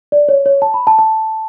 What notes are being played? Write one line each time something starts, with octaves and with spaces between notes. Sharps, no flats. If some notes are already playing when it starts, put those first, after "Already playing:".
D5
C#5
C#5
A5
B5
A5
A5